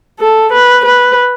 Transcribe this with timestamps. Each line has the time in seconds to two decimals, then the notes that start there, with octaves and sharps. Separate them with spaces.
0.20 A4
0.53 B4
0.85 B4